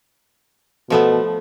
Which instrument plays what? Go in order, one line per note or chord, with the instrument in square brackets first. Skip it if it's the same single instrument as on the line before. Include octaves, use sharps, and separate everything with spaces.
[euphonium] B2 [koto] F3 A3 B3